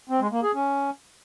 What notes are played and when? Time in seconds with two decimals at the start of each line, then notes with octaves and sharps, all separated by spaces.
0.09 C4
0.21 G#3
0.32 A#3
0.43 G#4
0.54 C#4